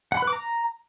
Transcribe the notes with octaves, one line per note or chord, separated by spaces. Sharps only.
F#5
B5
B4
D6
A#5